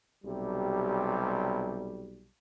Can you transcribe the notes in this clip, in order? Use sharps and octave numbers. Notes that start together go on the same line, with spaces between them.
B1 C3 G3